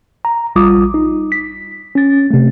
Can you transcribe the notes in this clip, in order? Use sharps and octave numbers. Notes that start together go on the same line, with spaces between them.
A#5
A#1 G3 F4 D6 D#6
D#4
B6
C#4 A6
C3 A3